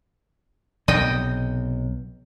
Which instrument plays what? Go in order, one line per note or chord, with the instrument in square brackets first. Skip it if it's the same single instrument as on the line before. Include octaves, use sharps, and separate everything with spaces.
[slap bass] B1 C3 [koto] D#5 G5